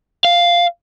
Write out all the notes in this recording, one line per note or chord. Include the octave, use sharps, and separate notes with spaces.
F5